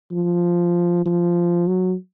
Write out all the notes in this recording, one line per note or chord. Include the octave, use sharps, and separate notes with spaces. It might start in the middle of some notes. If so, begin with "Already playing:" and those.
F3
F3
F#3